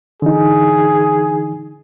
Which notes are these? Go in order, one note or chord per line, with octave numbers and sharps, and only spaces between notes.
D3 E3 D#4 G#4